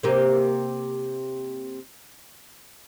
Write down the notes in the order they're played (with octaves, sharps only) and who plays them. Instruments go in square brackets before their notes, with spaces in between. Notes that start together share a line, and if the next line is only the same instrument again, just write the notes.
[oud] C3 A#3 G4